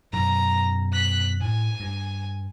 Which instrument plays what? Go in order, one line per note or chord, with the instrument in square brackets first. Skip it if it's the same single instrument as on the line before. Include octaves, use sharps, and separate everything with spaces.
[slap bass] F#2 B2 F#3 [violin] A#5
[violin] F#6 B6
[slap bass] A2 [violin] G#5
[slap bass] G2